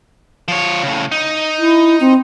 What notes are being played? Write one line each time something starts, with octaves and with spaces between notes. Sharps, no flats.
F3 C#5
A2 C#3
D#4
E4
C4